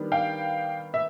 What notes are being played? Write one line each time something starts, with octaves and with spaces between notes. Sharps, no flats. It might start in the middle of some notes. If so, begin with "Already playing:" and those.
Already playing: D#3 G3 B3 D4
F5 G5
E5